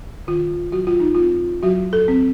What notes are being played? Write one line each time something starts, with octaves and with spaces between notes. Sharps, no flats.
D#3 F4
F#3 F#4
F4
D#4
C4 F4
F#3 F#4
A4
C4